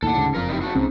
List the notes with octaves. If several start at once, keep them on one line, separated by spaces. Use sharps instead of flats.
D#2 A2 A4 F#5
D2 G#2 C#3
F#1 F2 F4 A#4
D#4 E4 G4
C#3 A3 F#4
C2 G#2 C4 C#4